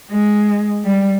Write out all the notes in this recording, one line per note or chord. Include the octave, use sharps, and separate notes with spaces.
G#3
G3